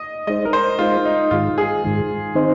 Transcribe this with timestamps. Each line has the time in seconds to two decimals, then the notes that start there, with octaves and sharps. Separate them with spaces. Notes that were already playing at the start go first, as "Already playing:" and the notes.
Already playing: D#5
0.27 G#3 D#4 C5 D#5
0.45 A#4
0.53 C5
0.79 G#3 D#4 F4 C5
1.05 D#4
1.31 G#2 D#3 G#3 F4
1.58 G#4
1.84 G#2 D#3 G#3
2.35 D#3 C4 D#4 C5